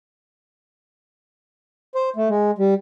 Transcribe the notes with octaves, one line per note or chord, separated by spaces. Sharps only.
C5
A3
G#3
G3